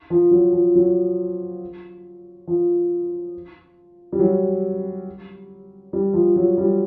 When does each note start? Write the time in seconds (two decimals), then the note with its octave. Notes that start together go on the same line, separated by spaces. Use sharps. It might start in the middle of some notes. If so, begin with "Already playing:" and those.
0.10 F3
0.31 F#3
0.53 F3
0.75 F#3
2.47 F3
4.12 G3
4.19 F#3
5.93 G3
6.13 F3
6.36 F#3
6.58 G3